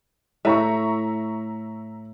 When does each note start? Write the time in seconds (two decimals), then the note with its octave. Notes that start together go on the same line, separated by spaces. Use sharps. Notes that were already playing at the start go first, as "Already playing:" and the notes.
0.45 A2 E5 A#5 C#6